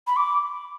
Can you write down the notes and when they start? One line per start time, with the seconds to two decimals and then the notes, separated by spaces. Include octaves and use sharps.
0.07 B5
0.16 D6